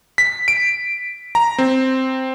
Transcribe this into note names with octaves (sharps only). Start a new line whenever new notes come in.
B6
D7
A#5
C4